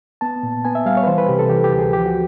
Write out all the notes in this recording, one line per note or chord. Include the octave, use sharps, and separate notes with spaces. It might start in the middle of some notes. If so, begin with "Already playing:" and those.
B3 A5
A#2
B3 G#5
E5
G3 F5
C#5
B4
E3 C5
B4
C3 G4
A4
E3 G4
G4
D2
G#4
F3 G4
F#4